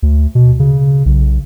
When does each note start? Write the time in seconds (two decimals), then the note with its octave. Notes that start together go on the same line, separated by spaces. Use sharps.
0.03 D2
0.35 B2
0.59 C#3
1.06 B1